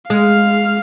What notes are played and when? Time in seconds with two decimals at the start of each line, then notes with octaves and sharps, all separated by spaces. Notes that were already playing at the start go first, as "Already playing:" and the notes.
0.10 G#3 F5 F6